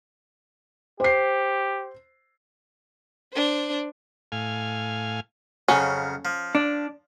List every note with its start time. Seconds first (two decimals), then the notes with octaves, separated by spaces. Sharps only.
1.00 G4 C5 C7
3.33 D4 C5
4.32 A2 F5 G#5
5.68 F2 C#3 F#3 C#4
6.25 F3
6.55 D4